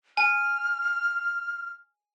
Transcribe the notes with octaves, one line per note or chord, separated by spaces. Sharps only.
G#5 F6